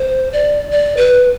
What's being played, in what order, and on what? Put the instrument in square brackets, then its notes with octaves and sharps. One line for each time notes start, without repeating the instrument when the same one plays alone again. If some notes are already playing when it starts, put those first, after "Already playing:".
Already playing: [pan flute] C5
D5
D5
B4